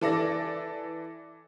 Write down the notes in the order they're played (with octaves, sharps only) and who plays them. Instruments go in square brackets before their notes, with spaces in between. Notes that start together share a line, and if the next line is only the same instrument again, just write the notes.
[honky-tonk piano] E3 A4 D5 A#6